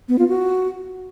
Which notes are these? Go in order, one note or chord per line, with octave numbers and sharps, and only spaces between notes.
B3
F4
F#4